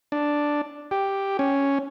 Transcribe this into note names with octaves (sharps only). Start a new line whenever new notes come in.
D4
G4
C#4